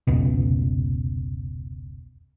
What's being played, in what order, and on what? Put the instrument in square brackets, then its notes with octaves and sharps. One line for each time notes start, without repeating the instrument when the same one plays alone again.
[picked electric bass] F1 C#2 B2